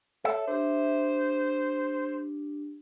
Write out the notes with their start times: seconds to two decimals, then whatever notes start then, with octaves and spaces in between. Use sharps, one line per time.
0.25 A4 C#5 E5
0.47 D4 G4 C5